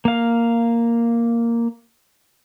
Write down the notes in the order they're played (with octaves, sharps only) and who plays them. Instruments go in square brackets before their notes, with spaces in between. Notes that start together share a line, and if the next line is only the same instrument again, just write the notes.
[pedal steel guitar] A#3 F5